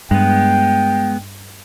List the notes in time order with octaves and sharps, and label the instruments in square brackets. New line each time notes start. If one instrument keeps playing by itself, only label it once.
[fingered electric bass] G2 [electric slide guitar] G#3 B3 [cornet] G5